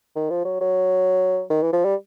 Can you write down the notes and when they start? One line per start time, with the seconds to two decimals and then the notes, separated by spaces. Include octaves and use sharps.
0.16 D#3
0.30 F3
0.45 F#3
0.61 F#3
1.50 D#3
1.62 E3
1.73 F3
1.85 G3